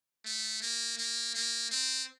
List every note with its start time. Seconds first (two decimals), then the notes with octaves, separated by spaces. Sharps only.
0.25 A3
0.62 A#3
0.98 A#3
1.35 A#3
1.71 C4